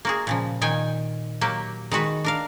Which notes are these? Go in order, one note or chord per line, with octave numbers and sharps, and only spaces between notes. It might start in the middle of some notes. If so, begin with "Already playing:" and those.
A#3 F#4 G#4
A#2 C#3 F3
A#2 D#3 G5 G#5
F#3 A#3 G4
D#3 G#3 F#4 B4
D4 A#4 F5